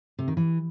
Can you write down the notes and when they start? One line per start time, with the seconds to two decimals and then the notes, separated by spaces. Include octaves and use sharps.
0.19 C3
0.28 D#3
0.37 E3